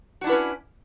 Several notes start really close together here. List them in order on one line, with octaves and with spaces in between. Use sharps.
F#4 D4 E4 B4 C#4